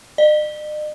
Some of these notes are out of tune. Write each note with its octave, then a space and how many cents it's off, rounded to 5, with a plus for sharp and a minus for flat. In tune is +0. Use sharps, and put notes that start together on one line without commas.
D#5 -45